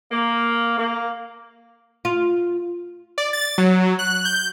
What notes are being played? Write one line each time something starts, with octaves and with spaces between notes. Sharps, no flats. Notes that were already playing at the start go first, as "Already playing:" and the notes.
A#3
A#3
F4
D5
A6
F#3
F#6
G6